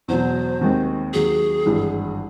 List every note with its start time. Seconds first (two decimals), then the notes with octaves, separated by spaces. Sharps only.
0.08 E2 B2 F#3 C5
0.61 D#2 D#3 G#3 C4
1.13 D#2 D#3 F#3 G#4
1.65 G#1 G2 E3 G#3